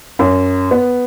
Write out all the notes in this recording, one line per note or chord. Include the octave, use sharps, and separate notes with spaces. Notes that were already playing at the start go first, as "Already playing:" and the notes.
F#2
B3